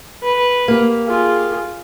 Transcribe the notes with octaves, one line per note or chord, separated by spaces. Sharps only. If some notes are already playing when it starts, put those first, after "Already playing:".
B4
A#3 G4
F4 G#4